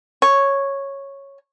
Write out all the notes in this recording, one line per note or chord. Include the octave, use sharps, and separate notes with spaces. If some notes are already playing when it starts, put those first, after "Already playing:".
C#5